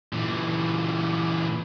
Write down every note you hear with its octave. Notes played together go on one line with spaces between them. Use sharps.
A#2 E3